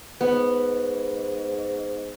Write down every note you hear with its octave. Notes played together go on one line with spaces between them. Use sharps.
G#2 B3